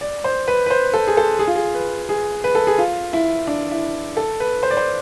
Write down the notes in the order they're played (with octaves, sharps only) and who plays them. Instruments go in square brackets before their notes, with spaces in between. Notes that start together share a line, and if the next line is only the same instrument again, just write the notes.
[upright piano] D5
C5
B4
B4
C5
A4
G#4
A4
G#4
F4
G#4
B4
G#4
B4
A4
G#4
F4
E4
D4
E4
A4
B4
C5
D5
C5